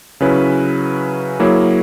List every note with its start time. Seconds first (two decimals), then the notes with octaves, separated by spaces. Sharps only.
0.20 C#3 F#3 C#4 E4 B4
1.40 F#3 A#3 E4 G#4 C#5